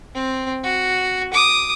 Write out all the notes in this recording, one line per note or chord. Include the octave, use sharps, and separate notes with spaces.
C4
F#4
D6 D#6